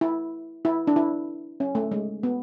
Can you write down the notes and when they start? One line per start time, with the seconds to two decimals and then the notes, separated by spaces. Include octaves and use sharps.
0.01 E4
0.65 E4
0.87 D4
0.96 E4
1.60 C#4
1.75 A3
1.91 G#3
2.23 B3